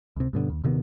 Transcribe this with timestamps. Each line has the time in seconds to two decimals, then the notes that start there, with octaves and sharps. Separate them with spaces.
0.16 C#2 C3
0.33 G2 B2 D3
0.50 D#2
0.64 D#1 C3 D#3 B3